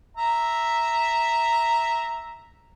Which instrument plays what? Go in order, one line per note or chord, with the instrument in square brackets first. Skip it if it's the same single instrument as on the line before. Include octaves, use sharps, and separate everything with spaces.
[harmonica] E5 A#5